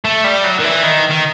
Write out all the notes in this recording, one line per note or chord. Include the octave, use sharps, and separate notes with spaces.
A3
G3
F#3
D#3
E3
D#3
D#3